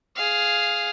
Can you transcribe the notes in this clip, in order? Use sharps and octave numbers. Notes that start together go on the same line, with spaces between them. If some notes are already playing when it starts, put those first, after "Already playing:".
G#4 F5